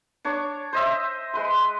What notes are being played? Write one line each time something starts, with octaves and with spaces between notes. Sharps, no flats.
D4 C#5 C#6 D6
C5 D#5 E5
G#3 B4 C6